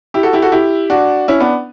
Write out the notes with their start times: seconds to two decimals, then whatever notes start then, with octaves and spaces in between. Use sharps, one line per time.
0.14 E4 G4
0.23 F#4 A4
0.33 E4 G4
0.42 F#4 A4
0.52 E4 G4
0.90 D4 F#4
1.28 C#4 E4
1.40 B3 D4